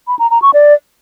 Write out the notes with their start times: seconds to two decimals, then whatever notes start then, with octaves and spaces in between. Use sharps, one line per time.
0.08 B5
0.19 A#5
0.31 A#5
0.42 C#6
0.54 D5